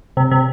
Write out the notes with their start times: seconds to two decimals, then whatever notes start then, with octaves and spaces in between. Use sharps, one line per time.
0.17 C3
0.31 C3